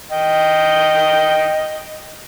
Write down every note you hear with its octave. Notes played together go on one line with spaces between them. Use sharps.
D#5 G5